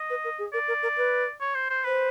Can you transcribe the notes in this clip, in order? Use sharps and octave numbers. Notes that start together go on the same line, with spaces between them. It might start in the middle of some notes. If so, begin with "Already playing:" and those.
Already playing: D#5
B4
A#4
G#4
A#4 D5
A#4
A#4
B4
C#5
C5
C5
B4 C5